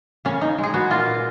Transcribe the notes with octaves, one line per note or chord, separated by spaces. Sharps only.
C#3 C#4
C#3 D#4
G#3
G#4
B3 F#4
A#2 F4
A#2